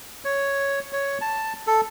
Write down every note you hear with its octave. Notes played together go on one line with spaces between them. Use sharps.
C#5
C#5
A5
A4